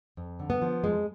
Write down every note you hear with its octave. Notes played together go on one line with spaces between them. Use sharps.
F2
D3
B3
F3
F2 G#3